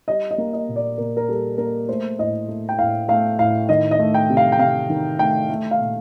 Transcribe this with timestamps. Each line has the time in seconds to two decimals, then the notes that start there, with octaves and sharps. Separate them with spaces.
0.08 G3 D#5
0.31 D#5
0.38 A#3
0.53 D#5
0.68 A#2
0.76 D5
0.98 A#2 A#4
1.17 A#4
1.28 G3 A4
1.58 A#3 A#4
1.89 A3 C5
2.19 A2 D#5
2.48 A3
2.69 G5
2.79 A2 F5
3.08 A3 F5
3.39 A2 F5
3.69 D#3 D#5
3.91 D#5
3.99 A3
4.14 G5
4.30 C3
4.37 F5
4.52 G5
4.59 C3 F5
4.90 D#3
5.19 A3 G5
5.50 A3
5.71 F5
5.80 A#2